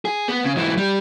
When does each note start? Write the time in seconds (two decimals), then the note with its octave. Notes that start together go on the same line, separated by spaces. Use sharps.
0.05 G#4
0.28 B3
0.44 C#3
0.56 G#2 E3
0.77 G3